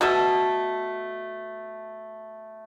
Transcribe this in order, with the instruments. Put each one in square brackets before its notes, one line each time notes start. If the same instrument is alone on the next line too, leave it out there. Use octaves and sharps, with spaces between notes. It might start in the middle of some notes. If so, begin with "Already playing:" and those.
[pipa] B2 A3 A4